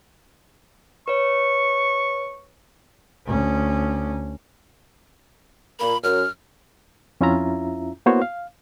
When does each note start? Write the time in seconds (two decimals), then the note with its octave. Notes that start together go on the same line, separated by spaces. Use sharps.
1.08 B4 C#5 C#6
3.26 D2 C#4
5.80 A#2 A#3 B5
6.04 F#2 F6
7.21 F2 C#4 E4 F4 E5 A#5
8.06 A#3 B3 E4 F#4 C5 C#5
8.22 F5